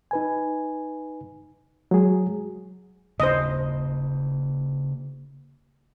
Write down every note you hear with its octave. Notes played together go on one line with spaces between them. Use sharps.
D#4 B4 G#5
F#3 G#3 G#4
C#3 A#3 D4 C5 D#5